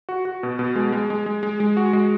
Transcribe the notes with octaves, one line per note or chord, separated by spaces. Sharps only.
F#4
F#4
B2
B2
G#3
G#3
G#3
G#3
G#3
G#3
F#4
G#3